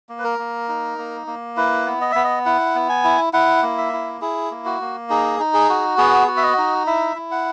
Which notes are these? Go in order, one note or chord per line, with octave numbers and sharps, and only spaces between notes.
A#3
B4
A#4
A#3
D#4
A#3
A#3
E4 B4
B3
D#5
B3 E5
D#5
E4 F#5
B3
G#5
E4
E4 F#5
A#3
E5
E4
E4 G#4
A#3
F#4
A#3
D#4 G#4
D#4
G#4
F#4
B3 G#4
F#4
E5
D#5
D#4
E4 E5
E4
F#5